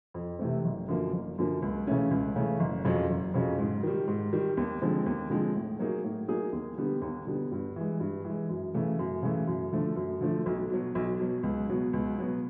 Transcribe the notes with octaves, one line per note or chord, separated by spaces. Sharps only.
F2
C3 E3 A3 C4
F#1
F#2 D3 F3 A#3
F#1
F#2 D3 F3 A#3
C#2
C#3 E3 A3 C#4
C#2
C#3 E3 A3 C#4
F#1
F2 C#3 F#3
F#1
F2 C#3 F#3
G#2
D#3 G3
G#2
D#3 G3
D#2
D3 F3 G#3 C4
D#2
D3 F3 G#3 C4
A2
F#3 A#3 D#4 G#4
A2
F#3 A#3 D#4 G#4
D#2
D3 G3 B3
D#2
D3 G3 B3
G2
E3 G#3
G2
E3 G#3
F#2
C#3 E3 A3
F#2
C#3 E3 A3
F#2
D3 F3 A3
F#2
D3 F3 A3
B1
B2 F#3
B1
B2 F#3
C#2
B2 F#3 B3
C#2
B2 F#3 B3